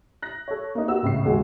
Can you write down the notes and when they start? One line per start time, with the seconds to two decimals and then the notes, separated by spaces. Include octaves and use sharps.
0.22 F#6 A#6
0.48 A4 C#5
0.75 A#3 D#4
0.88 B3 F#4 G4 E6
1.03 C#2 A2 C#3 C7
1.25 F#1 D#2 G#3 F#4 G#4